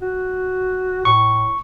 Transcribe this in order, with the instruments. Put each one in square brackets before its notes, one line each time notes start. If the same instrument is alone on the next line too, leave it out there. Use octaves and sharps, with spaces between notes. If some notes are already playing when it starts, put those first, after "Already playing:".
[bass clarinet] F#4
[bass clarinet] A2 [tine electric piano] C#6